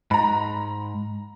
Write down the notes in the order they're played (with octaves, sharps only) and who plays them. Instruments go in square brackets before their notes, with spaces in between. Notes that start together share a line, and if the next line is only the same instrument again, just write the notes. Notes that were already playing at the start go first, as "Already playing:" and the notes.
[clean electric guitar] G#2 [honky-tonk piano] A#5 B5